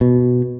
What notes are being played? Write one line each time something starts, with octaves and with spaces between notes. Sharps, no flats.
B2